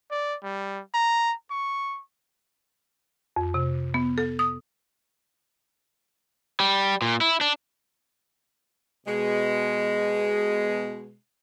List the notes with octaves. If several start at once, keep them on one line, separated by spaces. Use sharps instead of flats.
D5
G3
A#5
C#6
F2
C3
B3
A4
D#6
G3
A#2
E4
D4
B2 G#3